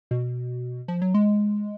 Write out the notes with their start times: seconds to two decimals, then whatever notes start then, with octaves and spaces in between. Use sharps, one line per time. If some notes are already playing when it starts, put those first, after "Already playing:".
0.11 B2
0.88 F3
1.02 F#3
1.14 G#3